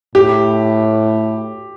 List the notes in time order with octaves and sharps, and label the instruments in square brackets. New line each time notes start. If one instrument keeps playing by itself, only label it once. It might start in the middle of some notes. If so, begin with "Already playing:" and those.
[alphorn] A2 [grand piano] G4